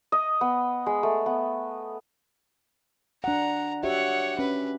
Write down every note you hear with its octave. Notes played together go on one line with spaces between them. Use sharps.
D#5
B3
G#3
A3
B3
D4 F#5 A#5
F#4 G4 C#5 E5 F#5
C#4 B4